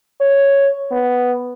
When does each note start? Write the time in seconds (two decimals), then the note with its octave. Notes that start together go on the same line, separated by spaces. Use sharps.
0.21 C#5
0.91 B3